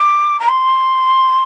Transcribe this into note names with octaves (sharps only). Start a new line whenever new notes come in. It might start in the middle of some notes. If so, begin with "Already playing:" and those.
Already playing: D6
A#5
C6